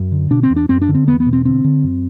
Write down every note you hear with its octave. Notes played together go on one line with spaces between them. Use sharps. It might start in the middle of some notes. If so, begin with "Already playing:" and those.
Already playing: F#2
D3
B2 D4
C4
E2
D4
F#2 C4
D4
D3
C4
E2 B3
B3
B2
C4
D3 C4
D3
F#2